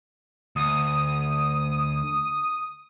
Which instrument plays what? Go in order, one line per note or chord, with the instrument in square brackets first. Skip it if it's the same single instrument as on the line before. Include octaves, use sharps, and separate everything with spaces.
[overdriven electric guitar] D2 [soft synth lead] D#6